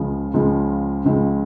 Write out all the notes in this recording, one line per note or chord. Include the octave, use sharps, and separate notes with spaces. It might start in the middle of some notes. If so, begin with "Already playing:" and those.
Already playing: C#2 C#3 F3
C#2 C#3 F3
C#2 C#3 F3